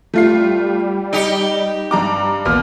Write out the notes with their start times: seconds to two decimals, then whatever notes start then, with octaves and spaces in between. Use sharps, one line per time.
0.14 G3 A3 F4 C7
1.13 D#4 G4 C#7 D7
1.91 G2 A#5 D6
2.45 A1 D#2 B3 F6